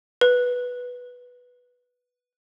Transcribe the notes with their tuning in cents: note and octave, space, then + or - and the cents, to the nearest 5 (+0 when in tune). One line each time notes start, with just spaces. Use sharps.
B4 -5